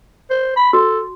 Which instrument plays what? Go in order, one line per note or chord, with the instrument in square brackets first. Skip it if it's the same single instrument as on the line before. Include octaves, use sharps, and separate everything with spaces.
[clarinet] C5
B5
[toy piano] F#4 [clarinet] A4